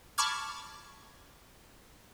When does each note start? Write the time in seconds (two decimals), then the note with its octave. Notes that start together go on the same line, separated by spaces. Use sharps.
0.18 A5 B5 C#6 D6 F6 G#6